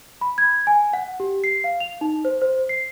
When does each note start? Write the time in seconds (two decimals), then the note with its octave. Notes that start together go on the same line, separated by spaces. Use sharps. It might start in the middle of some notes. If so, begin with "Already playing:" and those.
0.21 B5
0.38 G#6
0.67 G#5
0.93 F#5
1.20 G4
1.44 C7
1.64 F5
1.80 F7
2.01 D#4
2.25 C5
2.42 C5
2.69 C7